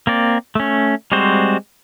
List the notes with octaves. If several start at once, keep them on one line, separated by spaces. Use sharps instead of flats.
A#3 C4 D5
A3 C#4
G3 G#3 C4 F#4 C5